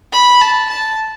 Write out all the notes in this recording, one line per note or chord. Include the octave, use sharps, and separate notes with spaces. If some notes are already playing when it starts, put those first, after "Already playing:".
B5
A5
A5